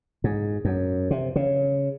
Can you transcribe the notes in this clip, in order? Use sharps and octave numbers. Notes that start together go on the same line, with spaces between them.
G#2
F#2
C3
C#3